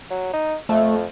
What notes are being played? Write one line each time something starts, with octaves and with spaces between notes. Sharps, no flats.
F#3
D#4
F2 A3